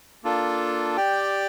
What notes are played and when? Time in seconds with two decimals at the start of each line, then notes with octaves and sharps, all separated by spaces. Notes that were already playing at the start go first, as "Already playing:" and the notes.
0.24 A#3 D4 F4 A4
0.97 G4 D5 G5